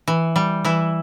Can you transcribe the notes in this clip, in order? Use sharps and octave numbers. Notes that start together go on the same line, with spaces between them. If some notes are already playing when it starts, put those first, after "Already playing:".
E3
G3
E3 E4